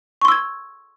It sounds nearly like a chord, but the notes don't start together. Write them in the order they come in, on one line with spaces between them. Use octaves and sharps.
C#6 C6 E6 G#6